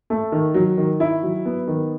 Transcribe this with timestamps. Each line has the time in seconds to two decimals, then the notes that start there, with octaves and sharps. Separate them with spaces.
0.10 A3
0.32 D#3
0.54 F#3
0.77 D#3
1.00 E4
1.23 F#3
1.45 B3
1.67 D#3